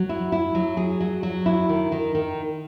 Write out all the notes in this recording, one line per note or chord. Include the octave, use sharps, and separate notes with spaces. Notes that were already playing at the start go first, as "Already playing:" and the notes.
Already playing: F#3
E4
E4
F#3
G#4
F#3
F#3
E4
D#3
D#3
D#3